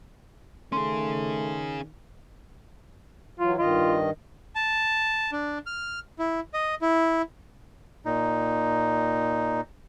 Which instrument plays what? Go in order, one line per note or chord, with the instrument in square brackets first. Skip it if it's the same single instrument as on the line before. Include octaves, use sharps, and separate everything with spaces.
[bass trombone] D#3 [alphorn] A3 [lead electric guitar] C#4 G#4 [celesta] C6
[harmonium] E3 F#3 [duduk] F4
[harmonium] G2 D#3 D#5 [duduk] F4
[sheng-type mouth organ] A5
D4
F6
E4
D#5
E4
[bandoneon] A#2 D#4